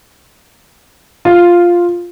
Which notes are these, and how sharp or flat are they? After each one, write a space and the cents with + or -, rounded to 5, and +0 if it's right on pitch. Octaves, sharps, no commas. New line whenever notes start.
F4 +0